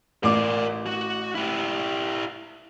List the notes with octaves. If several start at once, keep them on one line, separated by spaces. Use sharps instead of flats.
A1 A#4 D5 D6
F#4
E4 G4